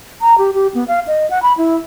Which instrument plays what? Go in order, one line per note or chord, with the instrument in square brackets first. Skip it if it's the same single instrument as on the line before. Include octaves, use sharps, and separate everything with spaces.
[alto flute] A#5
G4
G4
B3
F5
D#5
F#5
B5
E4